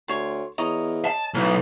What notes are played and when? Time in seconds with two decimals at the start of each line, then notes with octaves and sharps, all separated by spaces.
0.08 D2 C#5 C6
0.58 E2 C#5 D#5 A#5
1.05 A5
1.34 B1 A2